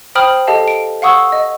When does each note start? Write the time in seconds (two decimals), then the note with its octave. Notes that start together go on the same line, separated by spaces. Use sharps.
0.15 C5 G5 B5 D#6 F6 F#7
0.47 G4 A4 D#5 F5 A5
0.68 D7
1.02 F5 F#5 C#6 D#6 E6
1.32 D#5